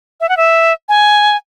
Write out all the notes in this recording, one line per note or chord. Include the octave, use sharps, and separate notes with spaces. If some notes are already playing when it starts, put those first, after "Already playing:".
E5
F#5
E5
G#5